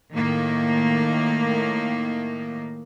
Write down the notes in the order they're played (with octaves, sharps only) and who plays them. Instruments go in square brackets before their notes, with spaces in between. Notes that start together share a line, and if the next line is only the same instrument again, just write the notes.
[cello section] A2 D#3 A#3